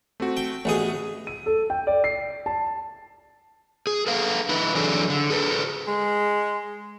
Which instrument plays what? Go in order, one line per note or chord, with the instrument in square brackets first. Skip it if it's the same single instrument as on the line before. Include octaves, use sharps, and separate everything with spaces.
[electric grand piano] A3 C4 F#4
[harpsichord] G5
[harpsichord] A1 B2 G#4 [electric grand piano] A3 F#5 D#7
[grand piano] D#7
A4
G5
D5
C7
A5
[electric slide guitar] G#4
A4 B4 F5
D#4 E4 B4
E3 F#3 D4 G#4 A4
D3
G#4 A4 B4
[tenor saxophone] G#3